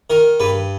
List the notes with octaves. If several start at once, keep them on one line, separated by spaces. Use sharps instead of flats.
D#3 A#4
G2 B4